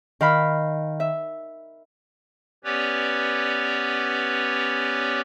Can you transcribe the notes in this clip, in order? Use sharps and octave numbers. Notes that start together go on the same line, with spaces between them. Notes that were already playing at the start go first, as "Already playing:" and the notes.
D#3 F5 B5 F6
E5
B3 C#4 G4 B4 C#5 D5